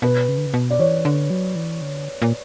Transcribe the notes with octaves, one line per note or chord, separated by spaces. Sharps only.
B2 B4
C#3
D3
C#3
B2
D5
E3 C#5
D3
F#3
E3
D3
A#2